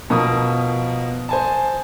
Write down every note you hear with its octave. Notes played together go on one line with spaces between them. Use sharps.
B2 F3 A#4 D#6
C5 G#5 A5